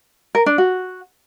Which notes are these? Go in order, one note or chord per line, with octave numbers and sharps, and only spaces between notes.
A#4
D4
F#4